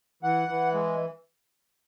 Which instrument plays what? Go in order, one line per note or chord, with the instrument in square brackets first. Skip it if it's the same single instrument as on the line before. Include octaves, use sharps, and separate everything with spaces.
[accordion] E3 F#5
E3
G#3